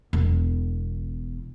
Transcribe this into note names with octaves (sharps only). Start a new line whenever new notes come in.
E1 B3